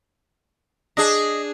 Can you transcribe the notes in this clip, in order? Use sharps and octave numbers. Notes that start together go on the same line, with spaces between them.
D4 G#4 D#5